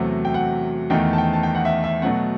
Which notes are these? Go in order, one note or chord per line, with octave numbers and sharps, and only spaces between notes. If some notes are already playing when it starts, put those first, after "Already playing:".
Already playing: E2 C3 F#3 A3 F#5
G5
F#5
E2 D#3 A3 G5
A5
G5
A5
G5
F#5
E5
E5
B2 F#3 A3 F#5